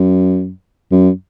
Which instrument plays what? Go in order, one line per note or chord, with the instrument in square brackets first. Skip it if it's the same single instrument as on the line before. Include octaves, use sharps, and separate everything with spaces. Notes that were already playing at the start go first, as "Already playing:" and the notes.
Already playing: [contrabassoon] F#2
F#2